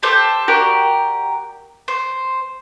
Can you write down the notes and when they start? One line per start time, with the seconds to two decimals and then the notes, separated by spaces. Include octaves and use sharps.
0.03 G4 A4 C5 G6
0.48 F#4 G4 A#4 D5
1.88 C5